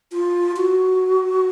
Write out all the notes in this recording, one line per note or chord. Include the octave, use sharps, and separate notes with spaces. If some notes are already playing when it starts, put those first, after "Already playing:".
F4
F#4